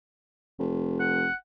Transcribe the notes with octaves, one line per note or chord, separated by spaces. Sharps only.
F1
F#5